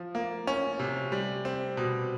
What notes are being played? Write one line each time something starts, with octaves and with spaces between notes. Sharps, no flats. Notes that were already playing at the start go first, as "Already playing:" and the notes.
Already playing: F3
A#3
C#4
C3
G3
C4
B2